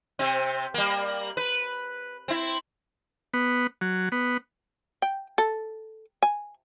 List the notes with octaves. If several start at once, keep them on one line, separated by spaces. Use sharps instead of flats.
C3 C4
G3 A#3
B4
C4 E4
B3
F#3
B3
G5
A4
G#5